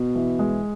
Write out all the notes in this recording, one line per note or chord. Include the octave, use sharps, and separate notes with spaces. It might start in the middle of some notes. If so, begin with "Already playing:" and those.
Already playing: B2
E3
G#3